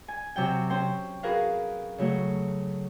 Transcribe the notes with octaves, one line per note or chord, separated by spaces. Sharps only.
G#5
C3 F#3 G5
C#4 C5 G5 C6
F#4 G#4 A#4 B4 F5
C#3 F#3 A3